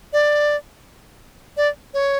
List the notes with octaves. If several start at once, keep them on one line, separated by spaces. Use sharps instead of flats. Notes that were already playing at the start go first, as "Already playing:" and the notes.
D5
D5
C#5